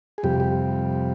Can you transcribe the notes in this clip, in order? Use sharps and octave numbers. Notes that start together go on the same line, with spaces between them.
G#4
F2 C3 G3 G4
G4